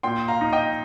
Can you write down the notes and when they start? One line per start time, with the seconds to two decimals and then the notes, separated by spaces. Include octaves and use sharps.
0.03 A#2 G5 C6
0.28 F5 A#5
0.41 D#4
0.53 D#5 G5